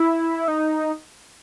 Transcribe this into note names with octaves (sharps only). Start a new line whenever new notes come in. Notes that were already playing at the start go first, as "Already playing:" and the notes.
Already playing: E4
D#4